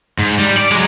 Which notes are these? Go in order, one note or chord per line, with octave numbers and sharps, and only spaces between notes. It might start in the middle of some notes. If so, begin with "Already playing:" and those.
G#2
G3
D5
F#3 G#3